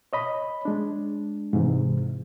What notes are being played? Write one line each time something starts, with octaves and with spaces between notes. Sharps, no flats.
C#5 D#5 B5
G#3 D4
G#2 C3 E3